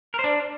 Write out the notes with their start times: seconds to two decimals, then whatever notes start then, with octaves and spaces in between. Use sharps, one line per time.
0.14 A#4
0.19 C5
0.24 D4